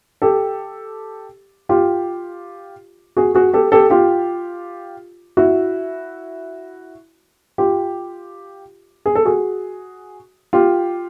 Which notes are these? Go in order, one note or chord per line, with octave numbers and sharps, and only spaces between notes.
G4 A4
F4 G4
F#4 G#4
F#4 G#4
G4 A4
G4 A4
F4 G4
E4 F#4
F4 G4
G#4
A4
F#4 G#4
F4 G4